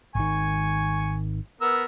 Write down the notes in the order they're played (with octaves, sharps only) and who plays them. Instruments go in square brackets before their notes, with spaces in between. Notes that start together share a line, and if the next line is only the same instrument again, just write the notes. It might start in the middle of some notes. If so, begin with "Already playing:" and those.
[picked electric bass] G#1 D#3 [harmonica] G#5 C#6
[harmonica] B3 A#4 E6